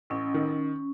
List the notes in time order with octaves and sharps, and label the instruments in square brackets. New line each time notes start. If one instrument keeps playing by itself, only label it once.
[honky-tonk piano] A1 [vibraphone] C#4
[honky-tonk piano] D#3